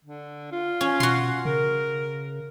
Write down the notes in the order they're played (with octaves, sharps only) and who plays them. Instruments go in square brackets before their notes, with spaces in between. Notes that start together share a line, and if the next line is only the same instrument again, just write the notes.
[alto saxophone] D3
F4
[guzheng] C#4
[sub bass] B2 [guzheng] F#4 C6
[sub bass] C#3 [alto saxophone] A#4